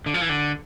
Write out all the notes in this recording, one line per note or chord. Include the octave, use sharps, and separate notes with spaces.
D3
F3
E3
D3